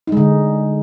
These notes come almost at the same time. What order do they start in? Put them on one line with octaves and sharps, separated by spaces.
D#4 G#3 D3